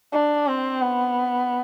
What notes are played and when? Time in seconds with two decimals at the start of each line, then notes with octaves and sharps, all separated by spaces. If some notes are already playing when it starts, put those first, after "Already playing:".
0.12 D4
0.47 C4
0.81 B3